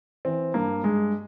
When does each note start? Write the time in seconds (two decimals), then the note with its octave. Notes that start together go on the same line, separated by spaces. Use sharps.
0.25 E3 C4
0.54 G2 A#3
0.83 G2 G#3